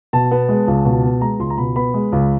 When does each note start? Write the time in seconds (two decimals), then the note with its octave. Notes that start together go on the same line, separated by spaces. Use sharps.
0.13 B2 A5
0.31 B3
0.49 G#3
0.68 C#2
0.85 B2
1.04 B3
1.21 G#3 A#5
1.39 C#2 C6
1.50 A#5
1.58 B2 B5
1.76 B3 B5
1.94 G#3
2.12 C#2